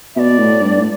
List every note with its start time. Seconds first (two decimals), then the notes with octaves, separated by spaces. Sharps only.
0.16 B2 D5 E5
0.39 A2
0.61 G2
0.79 A2